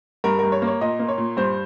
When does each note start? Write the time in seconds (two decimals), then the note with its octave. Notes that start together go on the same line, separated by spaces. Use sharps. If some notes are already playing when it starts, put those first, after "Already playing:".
0.24 G2 A#4
0.39 G2 A#4
0.52 C#5
0.62 A#3
0.67 C#5
0.81 A#2 D#5
0.99 A#3
1.09 C#5
1.18 A#2
1.37 G2 C5